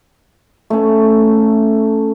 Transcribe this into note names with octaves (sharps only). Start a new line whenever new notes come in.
A3 C#4